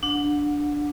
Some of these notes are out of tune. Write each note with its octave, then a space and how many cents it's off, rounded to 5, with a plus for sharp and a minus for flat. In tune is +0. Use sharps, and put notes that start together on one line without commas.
D4 +0 F#5 -30